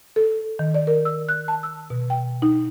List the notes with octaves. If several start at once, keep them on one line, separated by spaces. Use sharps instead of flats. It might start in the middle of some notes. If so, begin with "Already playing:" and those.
A4
D#3
D5
A#4
E6
F#6
A5
E6
B2
G5
D#4